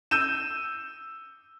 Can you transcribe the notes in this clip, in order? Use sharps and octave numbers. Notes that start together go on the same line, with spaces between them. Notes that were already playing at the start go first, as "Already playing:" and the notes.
E6 G6 D#7 E7